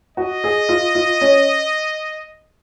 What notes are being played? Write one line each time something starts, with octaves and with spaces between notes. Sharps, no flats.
F#4 D#5
G#4
F4
F4
C#4